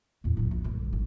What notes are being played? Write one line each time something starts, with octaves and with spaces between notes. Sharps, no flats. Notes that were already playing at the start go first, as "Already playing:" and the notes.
E2 A2
D1 B3
A#1
D2 G2
G#1